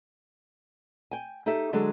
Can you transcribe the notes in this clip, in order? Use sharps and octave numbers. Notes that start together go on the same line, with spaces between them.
G5 G#5
D#4 G4 A4 E5
D3 F#3 G#3 D4 A4